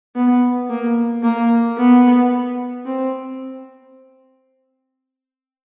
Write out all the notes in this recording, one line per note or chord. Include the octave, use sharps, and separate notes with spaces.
B3
A#3
A#3
B3
C4